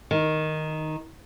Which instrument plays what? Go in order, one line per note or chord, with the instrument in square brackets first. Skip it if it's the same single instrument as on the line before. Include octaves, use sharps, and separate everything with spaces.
[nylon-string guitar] D#3